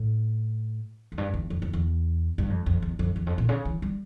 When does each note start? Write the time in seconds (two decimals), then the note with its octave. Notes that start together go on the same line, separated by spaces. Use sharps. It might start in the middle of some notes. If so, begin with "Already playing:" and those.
Already playing: A2
1.12 F2
1.18 G2
1.34 E2
1.50 F2
1.62 F2
1.73 E2
2.38 G2
2.50 F2
2.66 F2
2.82 E2
2.99 F2
3.16 E2
3.26 F2
3.38 A#2
3.49 C#3
3.65 E3
3.82 G3